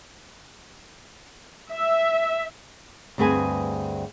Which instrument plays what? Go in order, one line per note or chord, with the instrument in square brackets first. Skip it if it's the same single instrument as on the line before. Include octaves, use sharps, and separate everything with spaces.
[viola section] E5
[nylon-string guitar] D2 G2 C4 G#4 B4 G#5